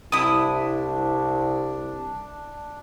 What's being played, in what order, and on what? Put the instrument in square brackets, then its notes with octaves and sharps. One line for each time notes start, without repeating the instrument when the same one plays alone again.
[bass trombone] C2 [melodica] D4 [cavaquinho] E4 D#6